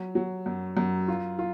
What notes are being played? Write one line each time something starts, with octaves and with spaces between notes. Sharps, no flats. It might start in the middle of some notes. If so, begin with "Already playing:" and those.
Already playing: F#3
F#3
F#2
F#2
F4
F4